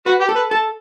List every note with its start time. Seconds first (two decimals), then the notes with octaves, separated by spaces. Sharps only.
0.06 F#4 B4
0.20 G4
0.29 A4
0.36 B4
0.51 A4 A5